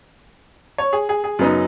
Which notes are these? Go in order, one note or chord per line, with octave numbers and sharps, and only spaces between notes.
C#5
G#4
G#4
G#4
F#2 C#3 F#3 B3 D#4